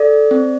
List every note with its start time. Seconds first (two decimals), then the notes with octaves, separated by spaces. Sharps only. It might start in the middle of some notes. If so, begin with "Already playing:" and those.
Already playing: A4 D5
0.31 C4